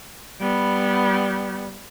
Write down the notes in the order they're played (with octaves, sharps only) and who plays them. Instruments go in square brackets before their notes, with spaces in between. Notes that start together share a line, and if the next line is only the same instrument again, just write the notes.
[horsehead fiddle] G3 B3